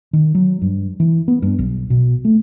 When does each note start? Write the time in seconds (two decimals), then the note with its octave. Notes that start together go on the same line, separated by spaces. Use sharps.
0.13 D#3
0.35 F#3
0.62 G2
1.00 E3
1.28 B3
1.42 G2
1.59 B1
1.90 B2
2.25 A3